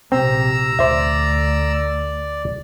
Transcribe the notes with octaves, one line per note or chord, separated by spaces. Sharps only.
A#1 C3 C4 A#5 E6
D2 C5 D5 E5